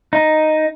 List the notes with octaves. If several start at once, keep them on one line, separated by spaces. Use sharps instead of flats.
D#4